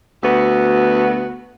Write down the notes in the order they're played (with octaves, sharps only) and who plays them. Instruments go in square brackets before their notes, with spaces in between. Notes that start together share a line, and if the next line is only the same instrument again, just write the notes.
[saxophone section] D2 B3 F#4